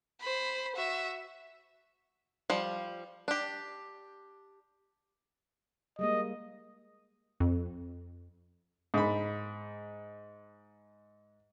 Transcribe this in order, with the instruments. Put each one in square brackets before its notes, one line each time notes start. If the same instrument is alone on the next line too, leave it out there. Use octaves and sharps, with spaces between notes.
[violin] C5 B5
F#4 E5
[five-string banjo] F3 G3
D4 G4
[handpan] G3 G#3 A#3 [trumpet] D#5
[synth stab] F2
[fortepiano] G#2 B5